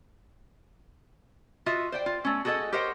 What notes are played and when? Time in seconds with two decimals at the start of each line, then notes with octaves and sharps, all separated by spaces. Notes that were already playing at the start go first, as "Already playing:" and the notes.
1.66 F4 F#4 D#5 E5
1.92 C5 D5 G5
2.06 F4
2.25 A3 C#4
2.45 F#4 G#4 A4 C5 D#5 F#5
2.73 G4 A#4 C5 C#5 D#5 F#5